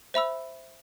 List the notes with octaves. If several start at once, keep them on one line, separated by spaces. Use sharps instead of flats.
C5 E5 B5 E6